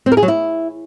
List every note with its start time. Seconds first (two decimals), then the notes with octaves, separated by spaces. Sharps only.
0.06 C4
0.12 A#4
0.17 G#4
0.23 F#3
0.28 E4